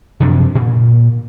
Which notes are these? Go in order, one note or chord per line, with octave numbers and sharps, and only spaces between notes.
F#2 C3 F3 D4
A#2